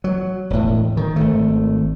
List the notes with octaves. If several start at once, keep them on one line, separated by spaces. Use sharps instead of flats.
F#3
E1 A2
D#3
G#1 A3